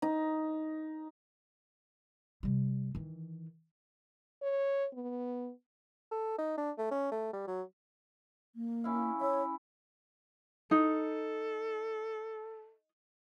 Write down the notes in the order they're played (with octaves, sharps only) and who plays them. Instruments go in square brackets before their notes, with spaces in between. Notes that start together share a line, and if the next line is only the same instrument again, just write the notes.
[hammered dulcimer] D#4
[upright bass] C3 G3
D#3 E3
[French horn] C#5
B3
[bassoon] A4
D#4
D4
A3
C#4
A3
G3
F#3
[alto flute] A#3
[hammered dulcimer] C#4 E4 F5
[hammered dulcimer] E4 [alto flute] C#5
[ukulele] D#4 [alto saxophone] A4